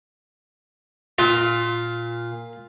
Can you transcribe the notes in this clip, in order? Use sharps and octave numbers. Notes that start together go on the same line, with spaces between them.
A#2 F4